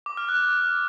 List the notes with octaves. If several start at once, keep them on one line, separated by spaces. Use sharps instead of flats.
D6
F6
F#6